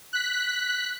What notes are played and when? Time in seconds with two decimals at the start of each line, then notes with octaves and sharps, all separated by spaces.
0.13 F#6 B6